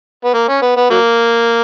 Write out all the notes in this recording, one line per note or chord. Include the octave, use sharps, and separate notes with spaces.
B3
A#3
C#4
B3
B3
F#3 A#3